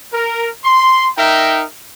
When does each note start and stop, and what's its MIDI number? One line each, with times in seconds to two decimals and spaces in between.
0.13 0.49 70
0.64 1.08 84
1.18 1.64 63
1.18 1.64 70
1.18 1.64 76
1.18 1.64 79